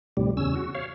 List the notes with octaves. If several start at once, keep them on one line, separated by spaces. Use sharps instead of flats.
D2 A2 C3 G3
E2 C#3 C#4 E6
F#4
C#5 F5